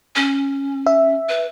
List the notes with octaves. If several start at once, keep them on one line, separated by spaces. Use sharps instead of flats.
C#4
E5
B4